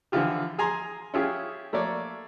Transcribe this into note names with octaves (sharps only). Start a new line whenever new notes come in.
D3 E3 F3 F4 G4
G#4 G#5 A#5 C6
C#4 E4 F4 G4 G#4
A3 A#3 C#5 D5